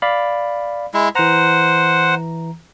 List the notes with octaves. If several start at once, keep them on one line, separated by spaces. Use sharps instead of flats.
D5 F5 B5
G#3 E4
E3 C5 F#5 A#5